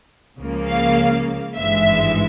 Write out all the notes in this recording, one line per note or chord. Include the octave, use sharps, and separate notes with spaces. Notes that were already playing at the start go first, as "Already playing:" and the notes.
C#2 C#3 F3 A#3
F5
G#1 G2 E3 G#3 E5